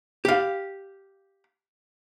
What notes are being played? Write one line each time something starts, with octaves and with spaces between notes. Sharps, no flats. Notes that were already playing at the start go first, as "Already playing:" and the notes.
G4 F5